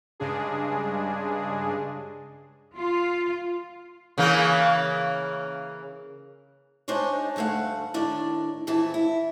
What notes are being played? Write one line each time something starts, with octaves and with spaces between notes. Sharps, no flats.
G2 C#3 G#3 D4 G#4
F4
C#3 E3 A#3
G#3 D4 D#4 C5 C#5
D2 G2 A3 F5 F#5
A2 D#3 D4 D5
F2 A#2 E3 E4 A5
E4